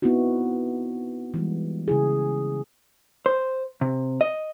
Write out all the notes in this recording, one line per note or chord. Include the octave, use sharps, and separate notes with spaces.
B3 C4 D#4 E4 F#4
E3 G3 G#3
C#3 E4 G#4
C5
C3
D#5